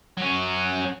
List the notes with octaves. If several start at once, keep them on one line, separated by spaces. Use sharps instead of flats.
F#3 C#4